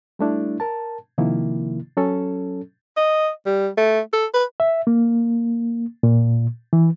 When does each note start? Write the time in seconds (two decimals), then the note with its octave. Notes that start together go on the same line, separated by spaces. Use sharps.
0.19 G3 A3 D4 E4
0.60 A#4 A5
1.18 C3 D#3 F3 A#3 E4
1.97 F#3 C#4 A4
2.97 D#5
3.46 G3
3.78 A3
4.13 A4
4.34 B4
4.60 E5
4.87 A#3
6.03 A#2
6.73 E3